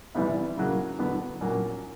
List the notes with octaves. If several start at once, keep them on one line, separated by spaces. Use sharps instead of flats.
C3 E3 G3 B3 E4
C#3 F#3 A#3
D3 F#3 B3
A#2 F#3 A#3 C#4